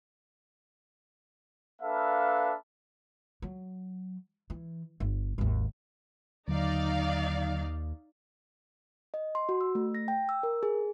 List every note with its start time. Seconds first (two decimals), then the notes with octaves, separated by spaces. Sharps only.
1.81 A#3 D4 A4 B4 E5 F5
3.42 F#3
4.50 E3
5.00 G1
5.38 G#1 D#2
6.48 D#2 D3 F#3 D#4 D5 F5
9.14 D#5
9.35 C6
9.49 F#4
9.61 E6
9.75 A3
9.95 A#6
10.08 G5
10.29 E6
10.43 A#4
10.63 G#4